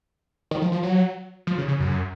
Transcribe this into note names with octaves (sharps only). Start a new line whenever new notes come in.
D#3
F3
F3
F#3
F3
C#3
C#3
F#2